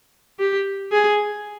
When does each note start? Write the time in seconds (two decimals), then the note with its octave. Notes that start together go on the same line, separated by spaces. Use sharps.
0.39 G4
0.92 G#4